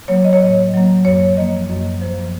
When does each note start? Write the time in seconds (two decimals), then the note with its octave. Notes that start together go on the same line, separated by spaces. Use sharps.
0.08 F#3 A#3 C#5
0.24 D#5
0.33 C#5
0.41 A2 D#5
0.74 F#3 A#3
1.05 F#2 C#5
1.37 F3 A#3 D#5
1.70 F#2
2.01 F3 A#3 C5